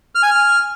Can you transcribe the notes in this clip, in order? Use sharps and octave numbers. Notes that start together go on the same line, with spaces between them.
F6
G#5
F6